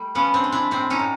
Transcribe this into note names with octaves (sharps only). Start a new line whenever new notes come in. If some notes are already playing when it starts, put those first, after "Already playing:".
Already playing: G3 A3
F3 B3 C#4
C4 D4
G#3
D4 E4
A2 C4 D4
C#4 D#4
A2